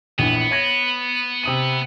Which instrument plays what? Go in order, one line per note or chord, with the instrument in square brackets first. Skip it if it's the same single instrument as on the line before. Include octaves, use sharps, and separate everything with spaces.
[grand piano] A#1 E3 [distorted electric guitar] B3
[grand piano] C#5 G#6 A#6
C3 D#6 D#7